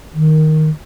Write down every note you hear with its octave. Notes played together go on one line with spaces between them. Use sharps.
D#3